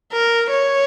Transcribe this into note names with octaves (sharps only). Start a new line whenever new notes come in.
A#4
C#5